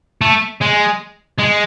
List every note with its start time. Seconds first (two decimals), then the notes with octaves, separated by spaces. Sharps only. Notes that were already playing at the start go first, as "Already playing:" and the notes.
0.21 A3
0.61 G#3
1.39 G#3